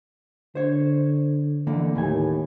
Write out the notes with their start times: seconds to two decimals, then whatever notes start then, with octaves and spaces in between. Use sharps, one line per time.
0.55 D3 C5 C#5
1.67 D3 E3 A#3
1.96 D#2 A2 G#5